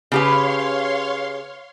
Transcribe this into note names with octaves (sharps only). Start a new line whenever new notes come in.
C#3 G4 B4 C#5 F5 C6